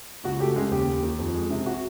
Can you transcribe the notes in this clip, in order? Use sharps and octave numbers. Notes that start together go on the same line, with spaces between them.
C#2 F#4
A3 G4
C#3 G#3 G#4
D#2 G4
D#2
D#3
F2
G#3
C3
F#4